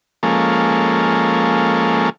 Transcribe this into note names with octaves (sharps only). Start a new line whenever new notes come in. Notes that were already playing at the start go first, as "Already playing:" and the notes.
F3 G#3 A#3 C#4 A4